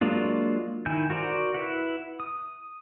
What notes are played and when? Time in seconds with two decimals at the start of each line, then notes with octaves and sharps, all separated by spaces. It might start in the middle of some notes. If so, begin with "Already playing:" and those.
0.01 F#3 G#3 A#3 D4 F4
0.86 D#3 E4 G#5 G6
1.10 F#4 A#4 C5 D5
1.54 E4 B4 F#5
2.20 D#6